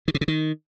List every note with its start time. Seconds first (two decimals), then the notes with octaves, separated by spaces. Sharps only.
0.08 D#3
0.14 C3
0.21 C#3
0.28 D#3